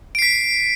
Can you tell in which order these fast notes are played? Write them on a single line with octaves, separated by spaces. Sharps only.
D7 C7 B6